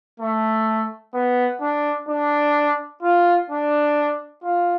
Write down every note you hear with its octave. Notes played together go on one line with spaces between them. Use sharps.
A3
B3
D4
D4
F4
D4
F4